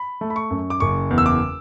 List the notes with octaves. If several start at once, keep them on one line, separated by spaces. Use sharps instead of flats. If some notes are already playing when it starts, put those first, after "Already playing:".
Already playing: B5
A3
B5
C#6
F#2
D6
F#1 C#6
E2
E6
D6